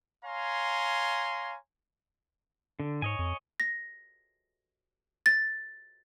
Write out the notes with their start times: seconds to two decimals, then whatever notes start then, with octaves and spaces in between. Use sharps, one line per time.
0.25 C#5 F5 G#5 A#5 C6
2.80 D3
3.02 G#2 C#5 D#5 G#5
3.19 F2
3.60 A#6
5.26 A6